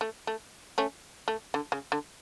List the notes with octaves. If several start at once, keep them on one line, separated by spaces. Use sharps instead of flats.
A3
A3
A3 C#4
A3
D3
C#3
D3